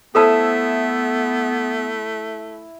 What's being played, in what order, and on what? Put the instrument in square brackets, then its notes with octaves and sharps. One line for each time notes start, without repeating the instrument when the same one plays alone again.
[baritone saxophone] A3 [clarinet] B3 [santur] E4 E5 D#6 [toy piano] A4 C5 A5